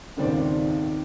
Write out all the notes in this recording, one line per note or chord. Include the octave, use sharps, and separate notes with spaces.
D#1 G#1 C#2 D#3 C5 D5